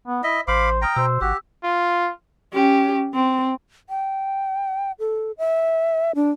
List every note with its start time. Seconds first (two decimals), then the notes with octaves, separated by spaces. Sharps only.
0.07 B3
0.24 E4 D#5 E5
0.48 A1 C5 F5 B5 D6
0.82 G5 A#5 D#6 F6 A#6
0.96 B2 C5 E6
1.21 G#1 F#4 G4 E6
1.64 F4
2.54 C#4 G4
3.14 C4
3.89 G5
4.99 A4
5.38 E5
6.15 D4